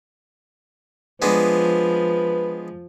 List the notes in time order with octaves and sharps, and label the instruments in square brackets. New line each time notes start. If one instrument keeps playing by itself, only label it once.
[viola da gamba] F3 [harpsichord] G#3 B3 D4 [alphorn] B4